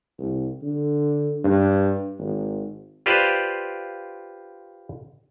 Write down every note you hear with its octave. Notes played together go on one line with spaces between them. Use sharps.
C2
D3
G2
G#1
F4 G4 B4 C5 D5